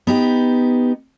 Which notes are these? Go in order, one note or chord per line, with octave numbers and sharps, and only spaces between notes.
B3 D#4 G4